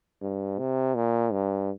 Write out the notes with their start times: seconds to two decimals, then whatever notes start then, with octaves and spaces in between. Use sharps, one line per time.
0.22 G2
0.59 C3
0.95 A#2
1.32 G2